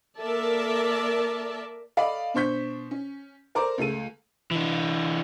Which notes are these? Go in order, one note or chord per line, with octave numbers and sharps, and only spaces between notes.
A#3 A4 A#4 D5 E5 A5
A4 D5 D#5 F5 B5
B2 D4 C5 C#6 G6 B6
C#4
A4 A#4 C5 D5 A#5 D6
C#2 A3 A4 D#7
E3 D4